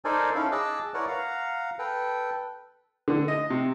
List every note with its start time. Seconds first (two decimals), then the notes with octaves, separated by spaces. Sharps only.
0.05 D#4 A4 A#4 C5 D5 G#5
0.35 C#4 D#4 E4 A4 F5
0.52 G#4 D#5 A5 D6 E6 F#6
0.94 E4 A#4 B4 C#5 D5 F#5
1.08 F5 F#5 A#5
1.79 A4 B4 G5
3.08 D3
3.28 D#5
3.50 C3